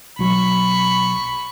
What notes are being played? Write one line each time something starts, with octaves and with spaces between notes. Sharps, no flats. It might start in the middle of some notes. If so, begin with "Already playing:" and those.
B1 F#3 B5 C#6